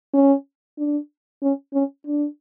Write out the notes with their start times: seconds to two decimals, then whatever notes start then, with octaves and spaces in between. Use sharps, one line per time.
0.13 C#4
0.78 D4
1.42 C#4
1.73 C#4
2.07 D4